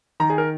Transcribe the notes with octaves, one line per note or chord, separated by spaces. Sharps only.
D#3 A#5
G#4
A#4